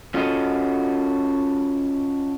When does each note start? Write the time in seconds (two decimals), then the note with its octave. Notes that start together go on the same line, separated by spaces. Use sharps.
0.14 C#4 F4 F#4 A4 D#5